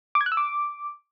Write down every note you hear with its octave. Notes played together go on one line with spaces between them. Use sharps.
D6
G#6
F#6
E6
D6